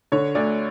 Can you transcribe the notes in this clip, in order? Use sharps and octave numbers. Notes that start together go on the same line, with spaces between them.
D3 C#5
D2 D5